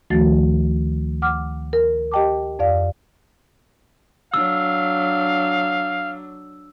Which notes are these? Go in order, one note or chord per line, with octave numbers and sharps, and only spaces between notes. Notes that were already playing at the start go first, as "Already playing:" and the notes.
D2 D#3 F3 A3 F#4 A6
F#5 D6 F6
A#4
G4 D#5 G5 A5 D6
F2 D5 F5
F#3 D4 F5 E6